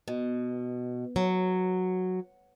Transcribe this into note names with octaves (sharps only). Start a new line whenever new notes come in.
B2
F#3